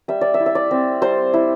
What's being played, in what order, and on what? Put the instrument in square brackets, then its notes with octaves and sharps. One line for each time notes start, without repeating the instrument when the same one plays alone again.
[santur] G3 E5
D5
E5
E4
E5
D5
C4
G3 C5
E4